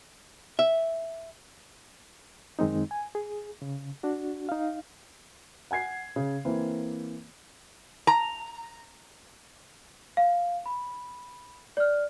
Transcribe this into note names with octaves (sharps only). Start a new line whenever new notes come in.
E5
F#2 D#3 G#3 C4 D#4
G#5
G#4
C#3
D4 F#4
D#4 F5
F#5 G#5 G#6 C7
C#3
E3 A#3 C4
A#5
F5
B5
D5 F6